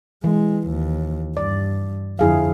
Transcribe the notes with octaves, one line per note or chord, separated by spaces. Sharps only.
E3 G#3
D#2
G2 D5
F2 D3 E4 G#4 F5